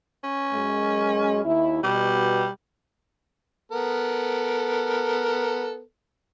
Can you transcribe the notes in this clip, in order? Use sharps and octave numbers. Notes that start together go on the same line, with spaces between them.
C#4
F#2 G#3
D#2 E4
B2 G3
B3 A4 A#4